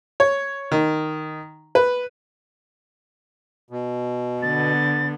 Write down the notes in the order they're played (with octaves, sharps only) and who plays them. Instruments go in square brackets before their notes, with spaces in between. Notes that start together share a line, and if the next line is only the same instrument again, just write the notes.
[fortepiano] C#5
D#3
B4
[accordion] B2
[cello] D3 B3 [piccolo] A6